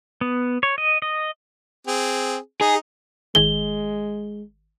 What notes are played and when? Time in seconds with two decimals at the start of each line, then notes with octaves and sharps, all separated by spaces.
0.21 B3
0.63 C#5
0.78 D#5
1.02 D#5
1.87 C4 G#4
2.61 D#4 G#4
3.35 G#1 D#3 G#3 G#4 G7